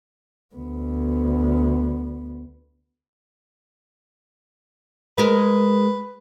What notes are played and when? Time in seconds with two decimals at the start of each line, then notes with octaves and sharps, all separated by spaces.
0.55 D2 B3
5.18 G#3 A#4 B4